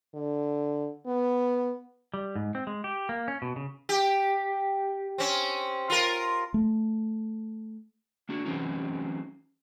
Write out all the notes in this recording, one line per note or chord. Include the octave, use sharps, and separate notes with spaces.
D3
B3
G3
G#2
C4
G#3
G4
A#3
C#4
B2
C#3
G4
C4 C#4
F4 A#4
A3
A#3 D4 F#4
E3 F#3 C4 C#4 D#4